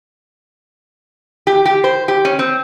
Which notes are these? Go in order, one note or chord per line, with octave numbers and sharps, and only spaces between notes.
G4
G4
C5
G4
C#4
C4